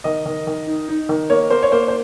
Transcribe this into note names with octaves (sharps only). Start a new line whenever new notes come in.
D#3 D#5
D#3
D#3
D#4
D#4
D#3
A#3 C#5
A#3 C5
C#5
A#3 C5
C5